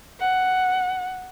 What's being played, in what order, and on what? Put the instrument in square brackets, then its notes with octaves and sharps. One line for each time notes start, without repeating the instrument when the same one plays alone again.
[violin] F#5